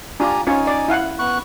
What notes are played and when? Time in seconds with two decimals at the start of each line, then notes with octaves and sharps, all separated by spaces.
0.20 D4 F4 G4 G#5 A#5
0.47 C#4 D#4 F4 C#5 G#5
0.67 D5
0.88 E4 F5 F#5
1.19 B3 C#6 F#6